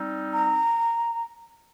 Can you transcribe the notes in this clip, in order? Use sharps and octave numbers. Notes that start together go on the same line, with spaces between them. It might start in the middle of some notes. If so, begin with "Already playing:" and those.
Already playing: G3 C4 D#4
A#5